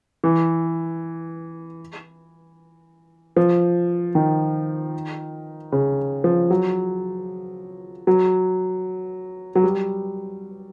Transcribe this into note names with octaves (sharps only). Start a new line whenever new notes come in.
E3
F3
D#3
C#3
F3
F#3
F#3
F#3
G3